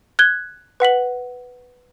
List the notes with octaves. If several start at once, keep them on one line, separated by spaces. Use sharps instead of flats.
F#6 G#6 G7
B4 F#5 B6 F#7